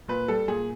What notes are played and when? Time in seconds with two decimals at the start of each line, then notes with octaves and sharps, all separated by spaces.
0.08 A#2 B4
0.28 G3 A4
0.48 A#2 G#4